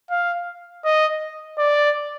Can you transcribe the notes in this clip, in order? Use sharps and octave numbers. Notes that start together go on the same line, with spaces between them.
F5
D#5
D5